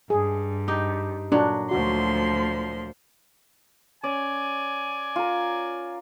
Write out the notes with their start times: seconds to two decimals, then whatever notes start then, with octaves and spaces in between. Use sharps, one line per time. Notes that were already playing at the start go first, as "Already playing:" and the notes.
0.10 G2 G#4
0.68 D#4 G4
1.32 A#2 F#3 D4
1.71 D2 F3 F#4 C6
4.04 C#4 D5 G#5
5.16 F4 A#4